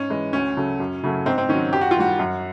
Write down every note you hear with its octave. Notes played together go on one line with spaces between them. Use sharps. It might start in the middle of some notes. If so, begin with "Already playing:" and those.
Already playing: G#2 C#4
E3 G#3
D2 C#4
C#3 F#3 A3
F#2
C#3 F#3 A3
G#2 C4
C4
D#3 F#3 C#4
F#2 G4
F#4
F4
D#3 G3 F#4
F#2